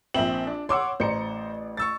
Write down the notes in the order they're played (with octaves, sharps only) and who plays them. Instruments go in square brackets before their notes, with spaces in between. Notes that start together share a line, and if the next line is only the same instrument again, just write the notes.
[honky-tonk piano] A#1 E5 F#7 [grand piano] C4
[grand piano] D4
[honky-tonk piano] C#5 D6 E6 [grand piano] F#5 C6
[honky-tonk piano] A1 D5 C#7 [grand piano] C5 A#5
[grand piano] C#6 E6 A6